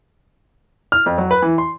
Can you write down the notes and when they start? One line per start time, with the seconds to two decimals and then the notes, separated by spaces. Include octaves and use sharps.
0.92 F6
1.06 F2
1.18 F#3
1.31 B4
1.42 E3
1.58 C6